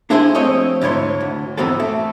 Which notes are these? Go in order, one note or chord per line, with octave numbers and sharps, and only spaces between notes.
D4 E4 G#4 C5 G#5 C6
F3 A3 C4 C#5 D#5
D2 G#2 E4 C#5 C6
D2
E2 G#2 E3 B3 C4 A4
A3